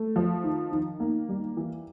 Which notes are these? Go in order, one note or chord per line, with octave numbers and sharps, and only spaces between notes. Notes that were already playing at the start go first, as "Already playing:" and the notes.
Already playing: A3
F3
D#3
D#3
A#3
G3
E3